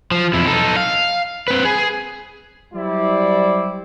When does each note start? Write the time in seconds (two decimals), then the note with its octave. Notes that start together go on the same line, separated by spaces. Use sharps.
0.11 F3
0.33 F2 E4
0.47 D#4 A4
0.76 F5
1.48 C4 B4
1.65 G#4
2.74 F#3 G3 E4 C5 D5